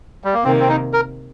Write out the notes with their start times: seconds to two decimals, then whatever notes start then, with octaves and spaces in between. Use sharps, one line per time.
0.24 G3
0.34 A#3
0.44 C3 D#3 A#3 C4
0.60 C4
0.69 D#4
0.93 A#4